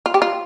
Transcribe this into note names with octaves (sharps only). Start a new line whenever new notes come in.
F4
G4
F4